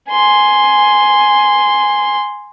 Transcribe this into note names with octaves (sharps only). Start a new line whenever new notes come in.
G#5 C6